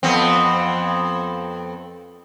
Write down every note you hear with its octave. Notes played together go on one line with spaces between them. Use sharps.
F2 B3 C4